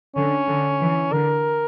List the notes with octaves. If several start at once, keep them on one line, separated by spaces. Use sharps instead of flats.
D3 C#4
D3
E3
D3 A#4